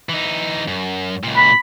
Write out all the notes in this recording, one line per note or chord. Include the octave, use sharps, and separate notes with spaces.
E3 D#4
F#2
C#2 A#2
B5